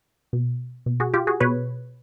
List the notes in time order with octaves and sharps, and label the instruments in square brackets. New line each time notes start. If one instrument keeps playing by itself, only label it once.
[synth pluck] B2
B2
F#4 G#4
F4 G4
F#4 G#4
B2 B4 C#5